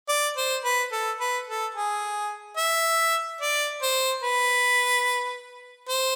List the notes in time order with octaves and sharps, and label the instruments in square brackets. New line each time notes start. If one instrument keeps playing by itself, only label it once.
[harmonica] D5
C5
B4
A4
B4
A4
G#4
E5
D5
C5
B4
C5